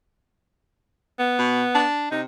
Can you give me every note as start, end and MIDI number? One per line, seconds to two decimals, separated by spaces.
1.19 1.84 59
1.39 1.63 47
1.75 2.07 62
2.11 2.25 48
2.11 2.21 63